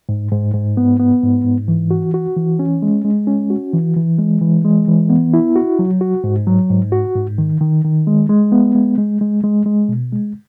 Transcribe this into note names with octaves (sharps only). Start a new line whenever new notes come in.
G#2
G#2
G#2
B3
B3
G#2
G#2
E3
F#4
F#4
E3
C#4
G#3
G#3
C#4
F#4
E3
E3
G#3
E3
G#3
E3
B3
E4
F#4
F#3
F#4
G#2
F#3
G#2
F#4
G#2
D#3
D#3
D#3
G#3
G#3
B3
G#3
G#3
G#3
G#3
G#3
B2
G#3